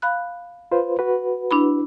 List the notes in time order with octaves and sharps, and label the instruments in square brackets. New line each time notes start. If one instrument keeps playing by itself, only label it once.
[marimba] F5 B5 F#6
[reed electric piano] F4 B4 C5
F#4 B4
[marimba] D4 E4 B5